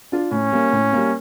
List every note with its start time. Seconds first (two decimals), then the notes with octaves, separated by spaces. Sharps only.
0.12 D4 F4
0.31 A2 C#4
0.52 G3 A#3
0.72 A2
0.93 G3 A#3